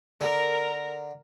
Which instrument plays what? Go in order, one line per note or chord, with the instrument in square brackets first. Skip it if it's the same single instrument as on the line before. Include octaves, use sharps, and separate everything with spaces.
[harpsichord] D3 [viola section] A#4 A#5